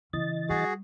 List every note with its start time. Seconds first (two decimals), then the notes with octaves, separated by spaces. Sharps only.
0.13 C#3 E3 D#5 A6
0.49 G3 F#4 G#4